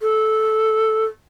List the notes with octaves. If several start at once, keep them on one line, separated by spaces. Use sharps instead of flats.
A4